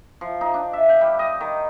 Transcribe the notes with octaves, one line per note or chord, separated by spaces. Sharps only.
F3
D#4
D4
E5
G5
G3
D#5
D#3